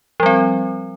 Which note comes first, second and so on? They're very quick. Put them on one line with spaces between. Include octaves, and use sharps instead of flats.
F3 G3 C4